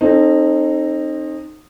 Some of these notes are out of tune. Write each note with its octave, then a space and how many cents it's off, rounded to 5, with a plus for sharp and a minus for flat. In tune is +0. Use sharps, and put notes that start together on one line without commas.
C4 +30 D#4 -15 A4 +0